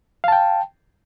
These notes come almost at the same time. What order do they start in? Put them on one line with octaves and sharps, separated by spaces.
F5 A5 G5